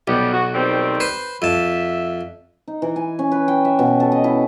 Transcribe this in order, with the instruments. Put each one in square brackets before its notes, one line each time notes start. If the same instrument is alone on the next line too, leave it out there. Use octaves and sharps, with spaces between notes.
[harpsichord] B1 [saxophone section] G3 B3
[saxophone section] F#4
D#3 G3 C4
[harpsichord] B4 C5
[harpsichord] F2 A5 [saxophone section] E5
[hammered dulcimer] D#4
E3
G#5
C#4
B4
G5
E5
B2
A4
D#5
E4